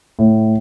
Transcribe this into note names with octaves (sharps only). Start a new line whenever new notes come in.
A2